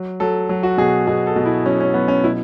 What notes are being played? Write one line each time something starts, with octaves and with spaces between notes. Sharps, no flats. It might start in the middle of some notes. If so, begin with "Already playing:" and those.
Already playing: F#3
F#3 A4
F#3
F#4
B2 G#4
B2 G#4
A4
B2
E4
F#3 C#4
C#4
F#3 B3
C#4
B2 E4